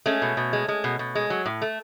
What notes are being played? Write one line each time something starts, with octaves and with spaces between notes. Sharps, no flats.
G#3 A3 C#4
B2
B2
G#3
G#3
B2
B2
G#3
F#3
A2
A3